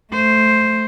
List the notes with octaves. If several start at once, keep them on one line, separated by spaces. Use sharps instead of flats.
A3 C5